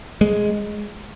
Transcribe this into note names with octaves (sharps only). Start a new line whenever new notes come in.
G#3